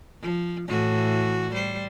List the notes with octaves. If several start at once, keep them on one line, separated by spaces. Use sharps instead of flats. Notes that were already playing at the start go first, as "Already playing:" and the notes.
F3
A2 E3 F#4
G3 C5